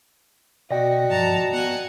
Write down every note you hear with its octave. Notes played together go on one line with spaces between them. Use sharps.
B2 F#4 D5 D#5 G5 A#6
G2 F3 A5 A#5
B3 F#5 G#5